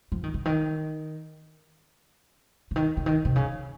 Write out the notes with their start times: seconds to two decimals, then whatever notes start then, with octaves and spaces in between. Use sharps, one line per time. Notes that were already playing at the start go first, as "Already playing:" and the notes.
0.12 F3
0.24 D#3
0.34 C#3
0.45 D#3
2.71 C#3
2.76 D#3
2.97 C#3
3.06 D#3
3.25 C3
3.36 C#3